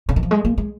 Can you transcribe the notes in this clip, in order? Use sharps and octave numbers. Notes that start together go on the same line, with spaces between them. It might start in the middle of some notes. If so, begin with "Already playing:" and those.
C#3
D#3
F3
G#3
A#3
G#3